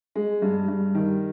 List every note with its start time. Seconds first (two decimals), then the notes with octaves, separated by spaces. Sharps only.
0.15 G#3
0.42 G2
0.68 G2
0.95 D#3